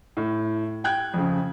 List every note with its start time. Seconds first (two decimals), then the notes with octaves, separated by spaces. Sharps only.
0.17 A2
0.84 G5 F#6 G#6
1.14 F2 C#3